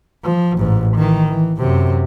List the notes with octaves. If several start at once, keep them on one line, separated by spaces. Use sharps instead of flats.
F3
A1 G#2
D#3 E3
E3
F#2 C3